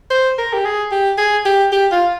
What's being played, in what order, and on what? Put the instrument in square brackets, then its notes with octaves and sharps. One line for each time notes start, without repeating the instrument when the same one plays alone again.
[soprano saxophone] C5
A#4
G4
G#4
G4
G#4
G4
G4
F4